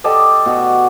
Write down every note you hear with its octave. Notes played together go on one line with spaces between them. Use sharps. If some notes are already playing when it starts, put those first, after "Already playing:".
G4 A4 D5 D#5
B2 F#4